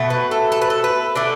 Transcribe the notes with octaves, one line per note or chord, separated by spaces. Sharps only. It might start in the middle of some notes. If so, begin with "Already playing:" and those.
Already playing: B2 A3
B4
A4
A4
B4
A4
B4
D3 A3 D5